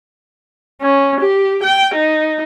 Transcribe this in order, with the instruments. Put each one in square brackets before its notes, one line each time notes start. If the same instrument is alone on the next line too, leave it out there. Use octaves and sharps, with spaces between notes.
[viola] C#4
G4
G5
D#4